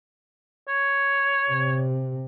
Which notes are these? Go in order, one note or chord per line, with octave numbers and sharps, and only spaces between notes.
C#5
C3